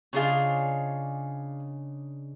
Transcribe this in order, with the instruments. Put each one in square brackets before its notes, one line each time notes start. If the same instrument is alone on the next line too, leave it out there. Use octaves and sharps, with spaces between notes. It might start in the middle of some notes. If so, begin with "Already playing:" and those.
[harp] C#3 D4 D#4 [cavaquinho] F4 G#4 C#5